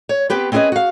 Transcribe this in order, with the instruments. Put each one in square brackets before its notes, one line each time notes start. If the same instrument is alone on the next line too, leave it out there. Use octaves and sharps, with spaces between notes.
[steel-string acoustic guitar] C#5
B3 C4 G4 B4
C4 C#4 E4 G#4 B4 D#5
F#4 F5